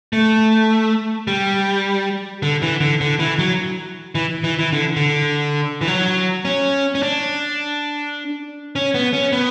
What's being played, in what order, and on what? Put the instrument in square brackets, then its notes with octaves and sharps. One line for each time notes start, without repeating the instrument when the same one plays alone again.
[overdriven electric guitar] A3
G3
D3
E3
D3
D3
E3
F#3
E3
E3
E3
D3
D3
E3
F#3
C#4
C#4
D4
C#4
B3
C#4
B3